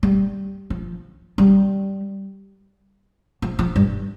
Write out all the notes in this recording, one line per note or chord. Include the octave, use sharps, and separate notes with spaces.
G3
F3
G3
F3
F3
G2